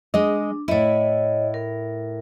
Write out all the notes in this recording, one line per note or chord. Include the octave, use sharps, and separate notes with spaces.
G#3 D4 D#5
A2 E4 C#5 D#5
A#4